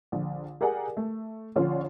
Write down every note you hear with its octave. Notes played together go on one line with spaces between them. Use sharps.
A#1 D3
G4 G#4 A#4 D5 F#5 G#5
A3
A#1 D3 C#4 F4